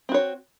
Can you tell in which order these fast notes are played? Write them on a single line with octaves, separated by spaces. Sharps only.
C4 F#4 C#5